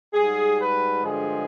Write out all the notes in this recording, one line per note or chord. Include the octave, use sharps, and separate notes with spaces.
G#2 G3 G#4
B4
G2 D3 F3 G#3 G#4